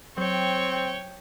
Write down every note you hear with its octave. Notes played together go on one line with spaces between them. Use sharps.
F#3 C4 C5 C#5 G5 G6